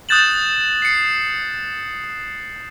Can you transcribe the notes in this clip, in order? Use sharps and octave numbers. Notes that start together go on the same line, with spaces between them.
D#6 F#6 G6 A6 E7 F#7
C7 C#7